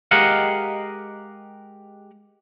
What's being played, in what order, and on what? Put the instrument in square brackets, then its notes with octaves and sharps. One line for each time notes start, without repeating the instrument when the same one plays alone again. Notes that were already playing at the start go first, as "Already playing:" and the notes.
[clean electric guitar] G#3 G4 A#4 D#5 F5 F#5